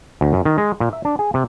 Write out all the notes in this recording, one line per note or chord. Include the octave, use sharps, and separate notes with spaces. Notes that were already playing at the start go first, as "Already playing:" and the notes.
D2
F#2
D#3
G#3
A#2
E5
D4
G#4
C3